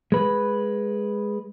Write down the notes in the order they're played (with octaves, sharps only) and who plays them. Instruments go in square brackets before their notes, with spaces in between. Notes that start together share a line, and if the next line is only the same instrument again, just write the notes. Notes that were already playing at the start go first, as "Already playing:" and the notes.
[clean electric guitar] G#3 B4